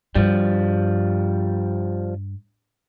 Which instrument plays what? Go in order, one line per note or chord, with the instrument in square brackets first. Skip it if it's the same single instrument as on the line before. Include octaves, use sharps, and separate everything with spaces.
[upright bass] G2 [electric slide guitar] F3 G3